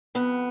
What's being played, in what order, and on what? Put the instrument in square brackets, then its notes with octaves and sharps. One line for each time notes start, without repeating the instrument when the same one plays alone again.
[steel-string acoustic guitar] F2 B3